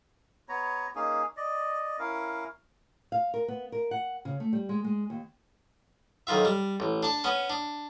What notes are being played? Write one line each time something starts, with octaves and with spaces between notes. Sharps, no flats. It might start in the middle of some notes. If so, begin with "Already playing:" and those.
B3 C#5 A#5
A#3 C#4 D#4 G#4
D5 D#5
C#4 E4 A#4 F5
F5
A#4
B3
A#4
F#5
C#3
A3
G3
G#3
G#3
D#2
B1 D#3 F4 E5
G3
A1
D4 A5
B3 C#4
D4